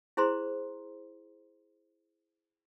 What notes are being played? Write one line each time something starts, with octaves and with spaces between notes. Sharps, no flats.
E4 G#4 C5 A#5 C6